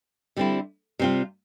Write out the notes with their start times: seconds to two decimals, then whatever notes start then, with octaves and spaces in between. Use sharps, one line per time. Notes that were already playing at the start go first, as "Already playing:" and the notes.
0.37 D3 G3 C4 E4
0.99 C3 G3 C4 F4